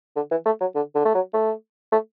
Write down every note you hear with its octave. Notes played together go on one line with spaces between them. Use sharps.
D3
E3
A3
F#3
D3
D3
A3
F#3
A3
A3